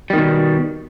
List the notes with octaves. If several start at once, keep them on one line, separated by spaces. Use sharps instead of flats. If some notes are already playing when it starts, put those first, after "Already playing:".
B2 D#3 G3